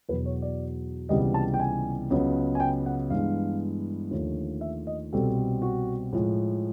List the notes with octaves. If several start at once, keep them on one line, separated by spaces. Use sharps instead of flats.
E2 B2 F#3 B3 B4
C#5
D5
C#2 C3 E3 G3 B3 D#5
A5
G5
G#5
C#2 C#3 F#3 B3
G#5
G5
F#5
G2 E3 G#3 B3 F5
D#2 D3 F3 A3
E5
D#5
C2 B2 G3 C4 A4
F#4
A2 F3 G#3